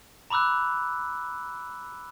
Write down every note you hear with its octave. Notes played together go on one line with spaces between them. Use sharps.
A#5 B5 D6 E6 F#6